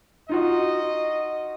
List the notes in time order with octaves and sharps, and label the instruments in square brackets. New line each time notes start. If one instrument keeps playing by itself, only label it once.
[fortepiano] D#4 F4 F#4 [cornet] D#5